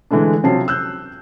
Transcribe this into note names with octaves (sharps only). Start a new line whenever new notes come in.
D3 E3 G#3 A3 D4
C3 F3 F#3 C#4 A5 C7
E6 F#6 G6